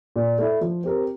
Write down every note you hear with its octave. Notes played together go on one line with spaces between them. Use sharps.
A#2
A3 E4
F3
C4 G4 A#4